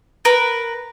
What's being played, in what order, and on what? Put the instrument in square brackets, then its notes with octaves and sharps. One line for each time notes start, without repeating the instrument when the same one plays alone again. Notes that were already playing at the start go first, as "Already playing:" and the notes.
[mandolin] A#4 B4